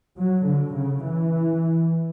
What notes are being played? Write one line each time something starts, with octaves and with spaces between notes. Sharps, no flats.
F#3
D3
C#3
E3